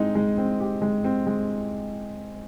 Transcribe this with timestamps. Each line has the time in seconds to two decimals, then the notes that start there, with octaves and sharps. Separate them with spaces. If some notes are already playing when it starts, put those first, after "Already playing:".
Already playing: G#3 C4 D#4
0.15 G#3
0.38 C4
0.60 G4
0.82 G#3
1.04 C4
1.27 G#3